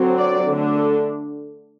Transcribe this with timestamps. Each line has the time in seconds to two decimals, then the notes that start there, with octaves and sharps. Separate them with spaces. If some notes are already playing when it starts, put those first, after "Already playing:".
Already playing: D3 F#3 C4
0.18 D5
0.48 D3 A3 D4
0.77 A4